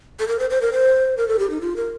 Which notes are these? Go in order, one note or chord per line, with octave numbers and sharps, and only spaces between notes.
A4
A#4
C5
C5
A#4
C5
A#4
A4
G4
D#4
F4
A#4